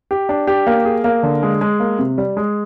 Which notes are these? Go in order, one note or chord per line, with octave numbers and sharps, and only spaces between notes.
G4
D4
G4
A#3
G#4
A#3
D3
G#3
G#3
A#3
C3
G3
G#3